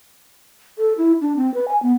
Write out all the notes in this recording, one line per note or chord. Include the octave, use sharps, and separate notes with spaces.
A4
E4
D4
C4
B4
G#5
B3